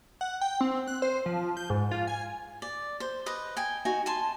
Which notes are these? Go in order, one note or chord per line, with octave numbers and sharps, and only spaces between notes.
F#5
G5
C4
F#6
C5
F3
G6
G#2
F4
G#5
D5
C5
B4 D#5
G5 G#5
D#4 F#4 G#5
G#5 A5 C6